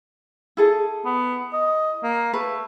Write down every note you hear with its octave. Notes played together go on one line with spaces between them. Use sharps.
E4 G#4 A4
B3
D#5
A#3
A3 B4